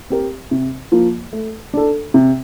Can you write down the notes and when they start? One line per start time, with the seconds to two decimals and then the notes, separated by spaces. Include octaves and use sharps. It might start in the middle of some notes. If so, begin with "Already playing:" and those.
0.10 C4 G4 A#4
0.51 C3
0.92 F3 A#3 F4
1.33 A3
1.74 D4 A4
2.14 C3